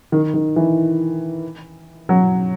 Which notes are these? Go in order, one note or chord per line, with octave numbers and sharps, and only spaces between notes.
D#3
D#3
E3
F#3